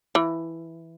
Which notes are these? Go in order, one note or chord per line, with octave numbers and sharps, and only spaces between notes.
E3